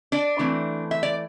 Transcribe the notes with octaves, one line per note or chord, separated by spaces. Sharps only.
D4 D5
E3 A3 C4
E5
D5